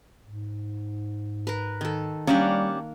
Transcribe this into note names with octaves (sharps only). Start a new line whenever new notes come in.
G#2
A#4 B4
D#3 A4
G3 A#3 C#4 D4 G4 F#5